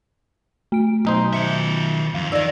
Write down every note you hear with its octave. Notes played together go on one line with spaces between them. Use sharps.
A3 D7
B1 D#4 C5
D#3 E5 G6 C#7
F2 F5
D#3 D#4 D5 D#5 E6 G#6 A#6